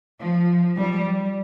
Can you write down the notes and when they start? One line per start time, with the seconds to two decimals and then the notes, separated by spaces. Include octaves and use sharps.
0.20 F3
0.77 G3